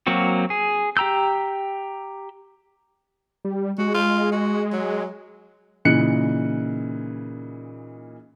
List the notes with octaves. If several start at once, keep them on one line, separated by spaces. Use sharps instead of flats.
F#3 A#3 C4 F#4
G#4
G4 G5 A#5 E6 G6
G3
G#3 F#4
F4
F#4
F#3
A#2 C#3 E3 D#4 F#6 C#7